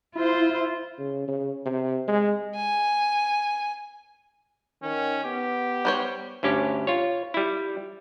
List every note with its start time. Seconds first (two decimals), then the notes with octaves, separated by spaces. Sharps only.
0.15 E4 F4 C5
0.98 C#3
1.28 C#3
1.65 C3
2.08 G#3
2.56 G#5
4.83 D#3 C#4
5.24 B3 G4
5.85 G3 C5 C#5
6.43 D2 G2 C#4 G4
6.87 F4 C#5
7.34 G3 E4